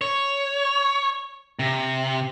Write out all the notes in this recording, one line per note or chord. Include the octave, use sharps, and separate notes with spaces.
C#5
C3